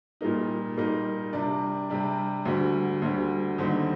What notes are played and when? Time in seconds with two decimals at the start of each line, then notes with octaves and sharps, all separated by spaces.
0.21 A#2 G3 A#3 D#4
0.77 A#2 G3 A#3 D#4
1.33 C3 G3 D4
1.90 C3 G3 D4
2.45 D2 D3 G3
3.02 D2 D3 G3
3.58 D#2 D3 G3 C4 D#4